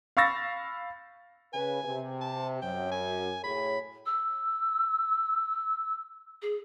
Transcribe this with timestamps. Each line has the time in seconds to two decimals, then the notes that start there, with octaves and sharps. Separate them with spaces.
0.17 F5 B5 C#6 E6 A6 A#6
1.53 C#3 B4 G#5
1.84 C3
2.21 A5
2.62 F#2 G5
2.92 G#5
3.44 A2 G#4 C#5 B5
4.05 E6
6.41 G#4